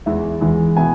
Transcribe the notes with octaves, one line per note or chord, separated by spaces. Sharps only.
E2 E3 G#3 E5
E2 E3 G#3
B2 B3 E4 G#5